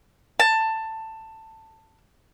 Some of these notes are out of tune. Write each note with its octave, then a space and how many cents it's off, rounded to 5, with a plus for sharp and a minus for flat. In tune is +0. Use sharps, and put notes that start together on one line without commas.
A5 +15